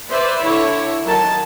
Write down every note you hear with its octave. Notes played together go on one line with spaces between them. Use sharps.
B4 C5 D5 E5
D3 E4 C#5
D#3 F#3 A#4 A5